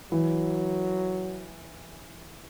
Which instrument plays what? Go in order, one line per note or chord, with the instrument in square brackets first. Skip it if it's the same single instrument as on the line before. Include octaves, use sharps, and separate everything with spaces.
[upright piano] E3 [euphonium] F#3